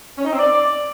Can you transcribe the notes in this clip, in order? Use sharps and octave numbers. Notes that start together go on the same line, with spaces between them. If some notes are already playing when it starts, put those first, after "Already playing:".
C#4
D#4
C4
D5